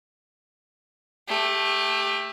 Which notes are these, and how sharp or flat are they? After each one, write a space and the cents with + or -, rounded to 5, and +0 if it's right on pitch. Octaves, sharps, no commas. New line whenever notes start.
A3 +0 G4 +20